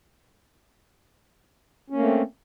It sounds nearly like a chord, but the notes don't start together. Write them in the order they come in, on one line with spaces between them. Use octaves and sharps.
C#4 A#3 A3 C4